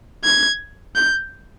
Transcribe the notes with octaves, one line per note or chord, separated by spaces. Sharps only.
G#6
G6